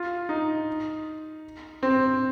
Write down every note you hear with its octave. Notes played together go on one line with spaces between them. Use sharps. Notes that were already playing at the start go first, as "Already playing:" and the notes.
Already playing: F4
D#4
C4